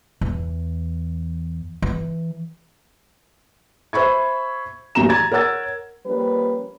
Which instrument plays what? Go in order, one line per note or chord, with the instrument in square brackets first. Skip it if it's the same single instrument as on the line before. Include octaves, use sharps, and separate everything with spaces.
[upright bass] E2
E3
[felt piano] C5 E5 B5 C#6 G#6
A1 D#2 F#3 C#4 A#5 E7
A#5 G#6 A6
A#4 C#5 F#5 E6 A6
[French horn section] F3 G3 A#3 C#4 B4